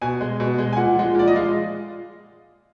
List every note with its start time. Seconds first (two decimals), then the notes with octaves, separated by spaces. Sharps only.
0.02 B2 G#5
0.21 G#3
0.40 B2
0.58 G#3
0.73 G#5
0.76 A#2 F#5
0.96 F3 G#3
1.15 A#2 D5
1.28 D#5
1.33 F3 G#3 F5